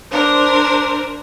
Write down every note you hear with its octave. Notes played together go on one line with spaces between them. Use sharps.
D4 A#4 C5